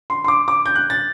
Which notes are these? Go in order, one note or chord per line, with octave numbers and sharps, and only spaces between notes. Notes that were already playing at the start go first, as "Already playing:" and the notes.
C6
C6
D6
D6
G6
F#6
A6